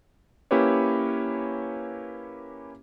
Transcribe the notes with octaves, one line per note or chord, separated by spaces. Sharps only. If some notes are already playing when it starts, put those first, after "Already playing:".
A#3 C#4 E4 G4 B4 C#5